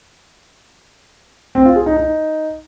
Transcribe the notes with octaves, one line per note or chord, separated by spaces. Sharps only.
C4
F4
G#4
D#4
D#4